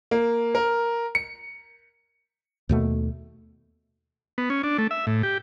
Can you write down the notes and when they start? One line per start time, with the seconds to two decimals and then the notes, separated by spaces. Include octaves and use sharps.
0.11 A#3
0.55 A#4
1.15 C#7
2.69 D#2 B2 A3
4.38 B3
4.50 C#4
4.63 D4
4.78 A3
4.91 E5
5.07 A2
5.23 G4